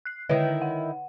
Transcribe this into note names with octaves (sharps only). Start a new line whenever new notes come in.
F#6 C7
D3 D#3 E4 B4 C#5
F#5